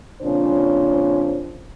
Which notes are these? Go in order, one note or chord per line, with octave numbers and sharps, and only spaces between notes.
F2 A#2 C#3 C#4 D4 C5